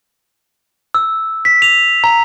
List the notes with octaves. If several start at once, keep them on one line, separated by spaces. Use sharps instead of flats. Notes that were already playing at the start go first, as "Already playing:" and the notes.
E6
B6
F7
A#5